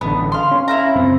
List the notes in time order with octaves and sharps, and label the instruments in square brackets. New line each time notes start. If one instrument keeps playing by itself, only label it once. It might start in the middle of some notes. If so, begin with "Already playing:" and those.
[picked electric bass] A1 D3 [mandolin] B3
[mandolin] F5 C6
[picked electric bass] C#4
[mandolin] E4 F5 A#5
[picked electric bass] F#2 C#3 C4